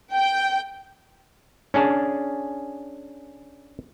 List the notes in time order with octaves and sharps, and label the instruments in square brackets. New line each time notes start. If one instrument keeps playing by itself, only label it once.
[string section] G5
[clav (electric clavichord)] C#4 D4 G#4 A5